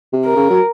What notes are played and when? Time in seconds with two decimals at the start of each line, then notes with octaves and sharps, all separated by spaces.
0.13 C3
0.25 A#4
0.36 C#3
0.50 F#3